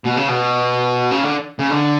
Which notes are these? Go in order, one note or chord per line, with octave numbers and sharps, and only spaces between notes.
B2
C#3
B2
C#3
D3
C#3
D3